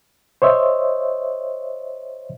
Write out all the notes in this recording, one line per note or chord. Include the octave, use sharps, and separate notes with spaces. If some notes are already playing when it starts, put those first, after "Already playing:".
C5 C#5 D#5 E5